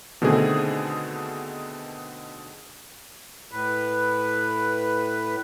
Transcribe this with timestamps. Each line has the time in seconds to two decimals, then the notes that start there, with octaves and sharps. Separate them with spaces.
0.22 B2 D3 D#3 A3 C4 G#4
3.51 A2 B4